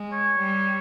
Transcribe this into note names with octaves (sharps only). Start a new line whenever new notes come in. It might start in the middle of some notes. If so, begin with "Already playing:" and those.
Already playing: G#3
C#5
G3